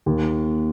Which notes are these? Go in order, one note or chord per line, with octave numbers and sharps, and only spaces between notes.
D#2